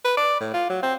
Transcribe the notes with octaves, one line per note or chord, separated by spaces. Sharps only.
B4
D5
A2
F4
F#3
C4